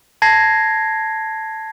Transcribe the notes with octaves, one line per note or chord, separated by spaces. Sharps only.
A5 G#6 A#6 C7